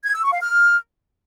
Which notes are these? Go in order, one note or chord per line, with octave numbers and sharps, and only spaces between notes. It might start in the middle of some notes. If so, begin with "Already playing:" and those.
G#6
E6
C#6
F5
F6